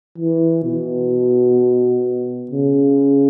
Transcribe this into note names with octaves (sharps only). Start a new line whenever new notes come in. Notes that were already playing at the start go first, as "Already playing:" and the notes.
E3
B2
C#3